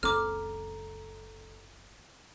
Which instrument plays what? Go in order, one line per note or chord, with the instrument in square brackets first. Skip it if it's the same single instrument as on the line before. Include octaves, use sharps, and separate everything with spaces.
[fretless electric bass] F#1 C#2 C4 [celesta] A4 A#5 [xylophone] D6 F6